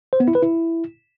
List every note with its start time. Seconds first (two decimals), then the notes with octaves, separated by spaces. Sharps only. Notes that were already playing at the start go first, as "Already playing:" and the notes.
0.13 C5
0.20 B3
0.28 E4
0.35 B4
0.43 E4